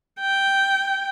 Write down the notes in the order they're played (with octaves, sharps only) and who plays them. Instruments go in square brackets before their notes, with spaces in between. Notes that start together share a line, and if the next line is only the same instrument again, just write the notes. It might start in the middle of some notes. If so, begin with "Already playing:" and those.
[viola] G5